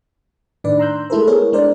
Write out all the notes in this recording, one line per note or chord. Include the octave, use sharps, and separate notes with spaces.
A2 D#3 D4 B4 D5
A#5 C6 E6 F#6 G6
G#3 A3 E4 A4 A#4 C5
B3 E4 G#4 A#4 C#5
G#3 D4 A#4 C5 D5